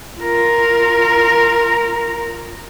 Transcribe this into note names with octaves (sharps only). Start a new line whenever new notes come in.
F4 A#4